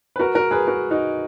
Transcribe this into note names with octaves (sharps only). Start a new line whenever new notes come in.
B4
F#4 A#4
F#4 A#4
G#4 B4
F#4 A#4
D#4 F#4